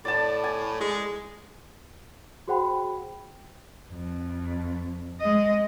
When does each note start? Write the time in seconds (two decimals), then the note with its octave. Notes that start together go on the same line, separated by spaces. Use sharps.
0.05 A2 D5 A5
0.44 G#5
0.81 G#3 D#5
2.48 F#4 G#4 C5 F#5 G5 B5
3.92 F2
5.21 G#3 D#5